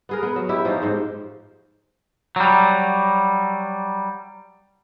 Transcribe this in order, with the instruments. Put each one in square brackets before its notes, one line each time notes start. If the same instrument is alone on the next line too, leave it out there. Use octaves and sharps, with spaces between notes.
[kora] B3 G#4 A#4
B3
F#3
E4 G4 E5
F3 C#4 D#4
G#2 C5
[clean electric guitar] F#3 G3